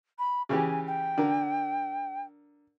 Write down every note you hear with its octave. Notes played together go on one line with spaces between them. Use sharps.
B5
C#3 E3 G4 G#5
G5
D3 A#4